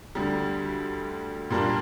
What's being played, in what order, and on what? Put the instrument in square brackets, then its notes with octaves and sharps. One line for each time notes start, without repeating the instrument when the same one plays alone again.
[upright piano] D2 D3 G3
A#2 G3 A#3 D4